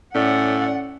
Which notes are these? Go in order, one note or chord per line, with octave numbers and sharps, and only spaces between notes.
A2 C#4 D5 F#5